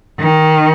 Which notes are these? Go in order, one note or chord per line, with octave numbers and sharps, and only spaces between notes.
D#3